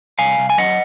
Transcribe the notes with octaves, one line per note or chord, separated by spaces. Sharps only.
C2 F5 G#5
C2
G#5
F#3 D#5 F#5